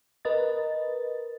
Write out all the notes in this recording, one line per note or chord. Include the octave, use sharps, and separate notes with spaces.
A#4 B4 D#5 A6